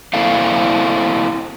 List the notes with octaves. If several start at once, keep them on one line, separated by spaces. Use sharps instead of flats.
A#3 C4 E4 A4 C5 F5